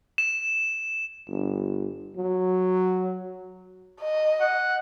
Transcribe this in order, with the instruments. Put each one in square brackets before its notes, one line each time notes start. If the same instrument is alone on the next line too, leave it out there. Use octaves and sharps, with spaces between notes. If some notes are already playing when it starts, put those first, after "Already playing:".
[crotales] E7
[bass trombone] G1
F#3
[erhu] D#5
[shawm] F#5